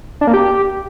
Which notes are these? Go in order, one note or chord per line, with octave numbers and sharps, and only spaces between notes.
D4
A#3
G4